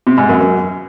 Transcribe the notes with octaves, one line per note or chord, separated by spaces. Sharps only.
C3
G#2
F#2
F#2